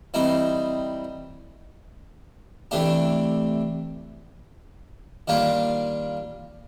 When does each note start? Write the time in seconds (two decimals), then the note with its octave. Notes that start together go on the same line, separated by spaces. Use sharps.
0.14 E3 G3 C4 D#4
2.71 C3 E3 A3 D4 G4
5.28 D#3 G3 A#3 D4 F4